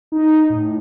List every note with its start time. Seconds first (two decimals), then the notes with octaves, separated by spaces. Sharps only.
0.12 D#4
0.50 A2